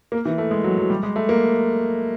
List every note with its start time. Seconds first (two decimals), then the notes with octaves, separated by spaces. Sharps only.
0.12 A#3
0.25 E3
0.38 A3
0.51 G#3
0.64 F#3
0.78 F#3
0.90 G3
1.03 G#3
1.16 A3
1.29 A#3